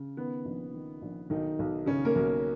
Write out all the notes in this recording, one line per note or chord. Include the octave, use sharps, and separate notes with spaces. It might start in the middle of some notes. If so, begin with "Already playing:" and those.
Already playing: C#3
D#3 B3
A#1
D#3
A#1
B1 D#3 D#4
B1
B1 C#3 C#4
A#3 A#4
B1